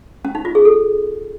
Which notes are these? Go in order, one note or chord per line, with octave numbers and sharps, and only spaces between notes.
C#4
D#4
F4
G#4
A4